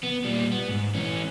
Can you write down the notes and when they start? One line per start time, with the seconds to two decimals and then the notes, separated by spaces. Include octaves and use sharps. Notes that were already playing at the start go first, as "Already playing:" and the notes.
0.04 B3
0.25 A#2 G3
0.52 B3
0.68 G#2
0.95 E3 C#4